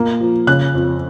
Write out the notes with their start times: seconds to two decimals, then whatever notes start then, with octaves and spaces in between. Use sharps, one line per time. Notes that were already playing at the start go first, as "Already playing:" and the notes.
Already playing: A#2 A#3
0.20 F3
0.47 C#3 F#6
0.74 F2